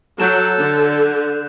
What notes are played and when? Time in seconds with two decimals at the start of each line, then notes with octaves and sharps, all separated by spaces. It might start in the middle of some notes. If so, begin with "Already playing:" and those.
0.20 F#3 A4 F#6 G6 E7
0.58 D3